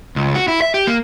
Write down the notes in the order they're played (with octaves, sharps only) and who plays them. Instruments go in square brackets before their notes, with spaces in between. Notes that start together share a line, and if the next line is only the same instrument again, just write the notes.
[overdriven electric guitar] C#2
F#4
E4
E5
G4
A#3